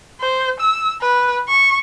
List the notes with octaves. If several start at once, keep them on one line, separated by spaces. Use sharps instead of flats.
C5
E6
B4
C#6